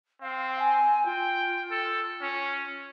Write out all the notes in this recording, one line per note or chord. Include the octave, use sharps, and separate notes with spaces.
C4 F5
G#5
F4 G5
A4
C#4